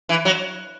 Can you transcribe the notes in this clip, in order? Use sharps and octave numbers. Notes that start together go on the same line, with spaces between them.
E3
F#3